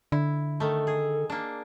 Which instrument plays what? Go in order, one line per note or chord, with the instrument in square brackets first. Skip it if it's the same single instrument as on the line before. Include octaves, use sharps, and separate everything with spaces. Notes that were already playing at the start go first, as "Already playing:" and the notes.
[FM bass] D3 [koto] E4
[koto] D#3 A3 [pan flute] A4
[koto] G#4
A#3 D4